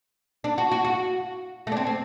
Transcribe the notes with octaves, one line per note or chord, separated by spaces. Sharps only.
D4
F#4
F#4
F#4
A3
D4
C4
C4